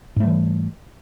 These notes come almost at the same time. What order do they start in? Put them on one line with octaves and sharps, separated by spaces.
G#2 A3 G3 E3